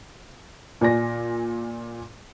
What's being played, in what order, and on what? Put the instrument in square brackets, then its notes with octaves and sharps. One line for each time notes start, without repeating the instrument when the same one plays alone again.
[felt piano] A#2 D5 G#5 A#6